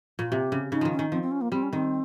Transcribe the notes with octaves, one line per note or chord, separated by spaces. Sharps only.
A#2 F4
C3 G4
C#3
C#3 D#4
D#3 F3
C#4
D#3
F3 C4
C4
C#4
A#3
G3 C4
C#4
D#3 C4